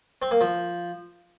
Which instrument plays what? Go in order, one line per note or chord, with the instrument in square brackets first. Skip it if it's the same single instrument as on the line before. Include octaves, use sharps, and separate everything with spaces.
[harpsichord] C4
A#3
F3